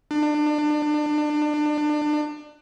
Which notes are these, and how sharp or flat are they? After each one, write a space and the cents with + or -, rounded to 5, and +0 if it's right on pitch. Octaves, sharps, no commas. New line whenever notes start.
D4 +30